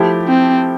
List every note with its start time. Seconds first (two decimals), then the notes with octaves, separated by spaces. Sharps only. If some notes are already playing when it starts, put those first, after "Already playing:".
Already playing: F3 A3 E4 G4
0.28 C4